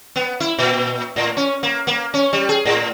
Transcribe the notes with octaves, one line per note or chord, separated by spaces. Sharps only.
B3
E4
A#2
A2
C#4
A#3
A#3
C#4
G3
G#4
A2